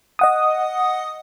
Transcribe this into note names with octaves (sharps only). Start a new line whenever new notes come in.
D#5 F#5 D#6